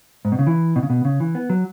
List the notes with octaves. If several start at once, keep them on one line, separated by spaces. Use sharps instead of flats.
G#2
B2
C#3
E3
B2
C#3
B2
C#3
E3
B3
F#3